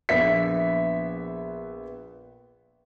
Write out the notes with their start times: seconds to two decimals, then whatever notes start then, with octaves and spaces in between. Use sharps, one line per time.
0.09 A#1 B3 E5 B6